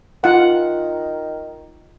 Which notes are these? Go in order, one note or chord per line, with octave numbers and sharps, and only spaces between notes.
D#3 F4 F#5